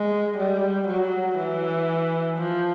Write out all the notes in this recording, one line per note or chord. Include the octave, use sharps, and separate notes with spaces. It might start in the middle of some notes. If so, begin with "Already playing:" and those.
Already playing: G#3
G3
F#3
E3
F3